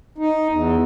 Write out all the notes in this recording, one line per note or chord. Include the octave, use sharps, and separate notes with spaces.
D#4
E2